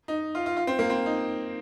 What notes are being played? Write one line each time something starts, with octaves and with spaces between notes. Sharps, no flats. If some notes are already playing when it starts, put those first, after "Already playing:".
D#4
F4
F4
F4
C4
A#3
C4
D#4